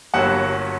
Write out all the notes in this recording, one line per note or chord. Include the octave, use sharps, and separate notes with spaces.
G1 G2 F#3 A#3 F#4 F#5